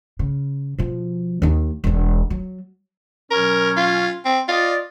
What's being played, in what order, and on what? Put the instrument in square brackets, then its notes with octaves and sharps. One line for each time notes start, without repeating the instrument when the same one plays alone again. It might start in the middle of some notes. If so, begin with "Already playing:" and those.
[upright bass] C#3
B2 F3
D#2 D#4
E1 E2
F#3
[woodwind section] B2 F#3 C#4 [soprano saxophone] A#4
[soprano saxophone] F4
C4
[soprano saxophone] F4 [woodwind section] D5 D#5